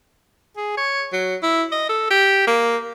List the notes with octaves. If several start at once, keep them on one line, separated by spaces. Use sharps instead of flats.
G#4
C#5
F#3
E4
D#5
A4
G4
A#3